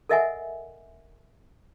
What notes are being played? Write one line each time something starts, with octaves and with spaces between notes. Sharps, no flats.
A4 A#4 D#5 E5 F#5 G#5